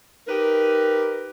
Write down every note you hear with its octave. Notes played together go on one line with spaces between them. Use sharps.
D#4 G4 A#4 B4